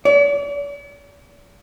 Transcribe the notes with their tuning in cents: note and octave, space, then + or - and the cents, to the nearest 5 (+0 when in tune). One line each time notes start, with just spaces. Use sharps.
D5 -45